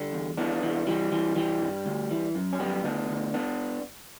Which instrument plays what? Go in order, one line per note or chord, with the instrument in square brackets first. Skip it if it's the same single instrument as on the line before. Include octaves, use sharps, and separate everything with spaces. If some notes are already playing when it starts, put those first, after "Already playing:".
Already playing: [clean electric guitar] D3 G3
E2
E3 B3 D4
E3
E3 G3
E3
E3 G3
G2
D2
E3
F#2
C#4
F#2 G3 B3
D2 B3 D4
D2
B3 D4